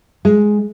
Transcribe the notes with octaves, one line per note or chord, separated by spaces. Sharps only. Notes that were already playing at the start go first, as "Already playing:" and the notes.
G#3